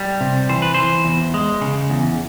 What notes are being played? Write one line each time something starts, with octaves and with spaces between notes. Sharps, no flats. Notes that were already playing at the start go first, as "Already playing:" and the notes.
Already playing: G3
C3
E3 C5
B4
E3 C5
E2
G#3
C#3
E2